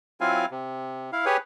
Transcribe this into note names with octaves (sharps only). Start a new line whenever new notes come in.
F#3 C4 E4 F4 F5 G#5
C3
E4 F5
G4 G#4 B4 C#5